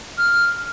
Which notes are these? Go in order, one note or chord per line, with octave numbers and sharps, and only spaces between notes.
F6